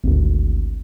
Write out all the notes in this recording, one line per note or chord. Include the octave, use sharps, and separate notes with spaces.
G#1 D2